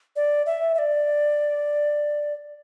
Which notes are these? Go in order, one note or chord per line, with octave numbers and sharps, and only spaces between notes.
D5
E5
E5
D5